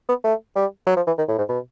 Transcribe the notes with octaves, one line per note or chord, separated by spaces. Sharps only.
B3
A3
G3
F#3
F3
E3
D#3
A2
G#2
B2